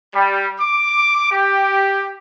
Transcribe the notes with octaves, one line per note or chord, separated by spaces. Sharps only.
G3
D6
G4